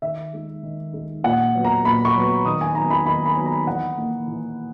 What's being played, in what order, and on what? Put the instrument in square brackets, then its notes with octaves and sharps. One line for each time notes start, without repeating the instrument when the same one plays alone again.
[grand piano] D#3 E5
G#3 D#4
D#3
G#3 D#4
A#2 F#5
F#3 B3
A#5
A#2 B5
C#6
F#3 B3
D#3 D#6
G#5
F#3 B3 D#4 A#5
B5
D#3 B5
B5
F#3 B3 D#4
A#5
E3 F#5
A#3 D#4
E3